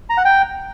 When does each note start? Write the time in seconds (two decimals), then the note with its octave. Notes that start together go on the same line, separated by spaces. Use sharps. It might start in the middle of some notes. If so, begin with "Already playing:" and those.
0.10 A#5
0.17 F#5
0.25 G5